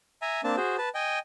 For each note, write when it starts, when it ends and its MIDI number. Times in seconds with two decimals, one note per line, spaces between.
0.22 0.41 76
0.22 0.41 80
0.22 0.41 82
0.44 0.56 58
0.44 0.56 60
0.44 0.56 62
0.44 0.56 81
0.57 0.76 66
0.57 0.76 68
0.57 0.76 72
0.78 0.89 71
0.78 0.89 81
0.95 1.19 75
0.95 1.19 79
0.95 1.19 80